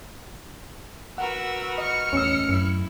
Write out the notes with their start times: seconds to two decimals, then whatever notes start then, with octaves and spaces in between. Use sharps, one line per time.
1.18 F#4 A#4 B4 F#5 E6
1.78 D#5 F6 C#7
2.13 E2 A2 C#4 D#5 E6
2.49 F#2 E4